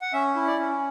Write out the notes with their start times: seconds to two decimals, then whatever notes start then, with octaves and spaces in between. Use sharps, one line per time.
0.02 F#5
0.13 C#4 E5
0.36 E4
0.47 D5
0.60 C#4